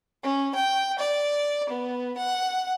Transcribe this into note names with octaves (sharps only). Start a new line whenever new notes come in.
C#4
G5
D5
B3
F#5